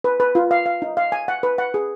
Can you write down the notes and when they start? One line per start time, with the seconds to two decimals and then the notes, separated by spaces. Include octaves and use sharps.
0.04 B4
0.20 B4
0.35 F4
0.51 F5
0.66 F5
0.82 D#4
0.97 F5
1.12 G#5
1.28 F#5
1.43 B4
1.58 F#5
1.74 G#4